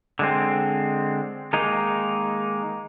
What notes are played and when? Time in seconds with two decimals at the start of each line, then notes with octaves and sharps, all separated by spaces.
0.19 D3 G#3 C4
1.53 D#3 G#3 A#3 D#4